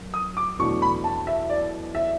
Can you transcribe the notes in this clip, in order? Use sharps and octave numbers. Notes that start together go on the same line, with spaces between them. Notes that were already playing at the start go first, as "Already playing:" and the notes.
Already playing: F#2
D#6
D6
E2 B2 F#3 A3 D4 C#6
B5
A5
E5
D5
E5